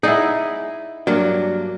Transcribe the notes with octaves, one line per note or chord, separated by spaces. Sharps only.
D#4 E4 G#4 D5 F#5
G2 F#3 A#3 D4